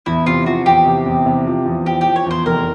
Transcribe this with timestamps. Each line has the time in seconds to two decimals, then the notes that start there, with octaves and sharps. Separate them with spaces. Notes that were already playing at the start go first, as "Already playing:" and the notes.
0.06 E2 E4
0.26 C3 F4
0.46 F3 F#4
0.66 E2 G4
0.86 C3
1.06 E2
1.26 C3
1.47 F3
1.66 E2
1.86 F3 G4
2.01 F3 G4
2.16 C#5
2.26 E2 C5
2.46 F1 A#4